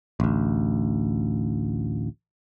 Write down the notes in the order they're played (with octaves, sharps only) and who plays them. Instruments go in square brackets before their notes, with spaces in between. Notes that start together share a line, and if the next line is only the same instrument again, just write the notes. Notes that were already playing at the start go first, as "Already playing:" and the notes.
[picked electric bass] A1 D2